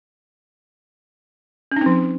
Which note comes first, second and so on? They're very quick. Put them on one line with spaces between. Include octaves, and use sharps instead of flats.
C#4 D#4 C4 F3